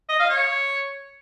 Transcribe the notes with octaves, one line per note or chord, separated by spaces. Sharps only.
D#5
F5
C#5